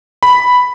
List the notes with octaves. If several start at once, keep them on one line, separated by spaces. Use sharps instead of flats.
B5